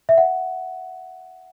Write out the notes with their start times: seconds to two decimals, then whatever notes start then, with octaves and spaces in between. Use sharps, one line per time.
0.09 E5
0.18 F#5